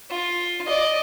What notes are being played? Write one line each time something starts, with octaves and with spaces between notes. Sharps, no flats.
F4
D5 D#5